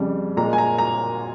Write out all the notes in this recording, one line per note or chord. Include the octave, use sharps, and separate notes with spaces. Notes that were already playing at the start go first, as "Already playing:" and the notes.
Already playing: F2 C#3 G3
A#2 G#3 A#5
G#5
A#5
A#5